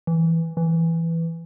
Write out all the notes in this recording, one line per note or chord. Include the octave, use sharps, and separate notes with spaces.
E3
E3